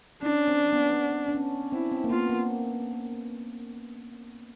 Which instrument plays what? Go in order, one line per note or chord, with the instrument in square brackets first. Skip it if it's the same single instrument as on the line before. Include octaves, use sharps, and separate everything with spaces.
[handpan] C#4 [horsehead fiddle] D4
[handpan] C4
B3
D4
C#4
[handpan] C4 [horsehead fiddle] E4
[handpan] C4
A#3
[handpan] B3 [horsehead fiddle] F4
[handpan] A#3